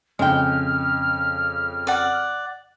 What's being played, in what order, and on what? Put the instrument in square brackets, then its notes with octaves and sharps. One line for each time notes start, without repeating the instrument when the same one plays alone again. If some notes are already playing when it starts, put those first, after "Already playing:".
[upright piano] F2 C#3 [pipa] G#3 G5 [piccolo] F6
[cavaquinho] D5 F#5